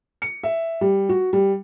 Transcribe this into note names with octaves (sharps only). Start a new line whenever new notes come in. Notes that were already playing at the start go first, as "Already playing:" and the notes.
C#7
E5
G3
F#4
G3